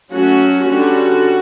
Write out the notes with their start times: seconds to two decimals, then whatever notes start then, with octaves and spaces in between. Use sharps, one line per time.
0.12 F#3 A3 C#4 F#4
0.67 D3 G3 C#4 F#4